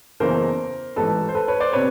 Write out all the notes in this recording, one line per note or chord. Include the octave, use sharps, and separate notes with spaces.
F#1 E2 C#3 E3 A#4 C5
A1 G#2 E3 A4 B4
C5
A4 B4
B4 C#5
C5 D5
C3 B4 C#5